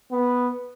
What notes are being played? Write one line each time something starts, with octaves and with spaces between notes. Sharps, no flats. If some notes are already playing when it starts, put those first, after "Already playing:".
B3